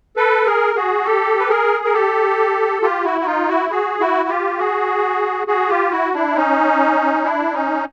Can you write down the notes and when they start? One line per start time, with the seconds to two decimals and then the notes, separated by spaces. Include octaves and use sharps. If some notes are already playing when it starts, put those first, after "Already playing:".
0.17 A4 B4
0.46 G#4 A#4
0.76 F#4 G#4
1.05 G4 A4
1.39 B4
1.50 G#4 A#4
1.84 A#4
1.94 G4 A4
2.82 F4 G4
3.04 E4 F#4
3.21 F#4
3.26 D#4 F4
3.48 E4 F#4
3.71 F#4 G#4
4.00 E4 F#4
4.29 F4 G4
4.59 F#4 G#4
5.47 F#4 G#4
5.69 F4 G4
5.92 E4 F#4
6.14 D4 E4
6.35 C#4 D#4
7.24 D4 E4
7.54 C#4 D#4